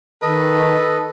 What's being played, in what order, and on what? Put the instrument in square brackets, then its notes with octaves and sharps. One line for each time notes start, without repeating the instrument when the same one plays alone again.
[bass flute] D#3 [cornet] A4 [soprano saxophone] B4 [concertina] D#5